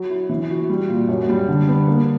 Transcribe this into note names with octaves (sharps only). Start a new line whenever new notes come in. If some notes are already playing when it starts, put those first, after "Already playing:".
Already playing: F#3
E4
E3
F#4
G3
A#2
F#2
G3
D3
B3
A#3